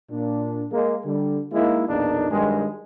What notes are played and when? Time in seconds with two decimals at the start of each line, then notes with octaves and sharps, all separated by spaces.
0.11 A#2 D4
0.72 G#3 A#3
1.05 D3 G3
1.53 G#3 A#3 D#4 E4
1.88 B1 E2 A#2 A#3 D4 D#4
2.30 G2 D#3 F#3 G#3